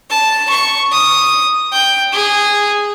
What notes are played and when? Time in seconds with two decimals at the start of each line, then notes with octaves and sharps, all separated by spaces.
0.10 A5
0.50 C#6
0.92 D#6
1.72 G5
2.13 G#4